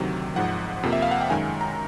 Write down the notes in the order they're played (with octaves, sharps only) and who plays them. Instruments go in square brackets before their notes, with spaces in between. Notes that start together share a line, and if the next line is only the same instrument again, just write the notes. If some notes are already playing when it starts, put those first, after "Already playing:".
Already playing: [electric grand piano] D2 C3 D#3 F#3
G#1 G#2 F3 F#5
F2 C3 F3 A#3
E5
F5
F#5
G5
F#2 D#3 G#3 G#5
A#5